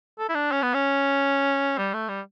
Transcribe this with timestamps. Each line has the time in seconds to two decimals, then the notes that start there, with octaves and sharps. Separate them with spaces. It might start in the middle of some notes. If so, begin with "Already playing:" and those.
0.19 A4
0.29 E4
0.35 D4
0.52 C#4
0.63 B3
0.74 C#4
1.78 G3
1.94 A3
2.09 G3